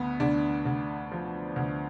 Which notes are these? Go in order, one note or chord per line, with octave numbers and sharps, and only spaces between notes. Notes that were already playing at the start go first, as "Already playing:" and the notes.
Already playing: D2 B3
D2 D4
D2
F3
D2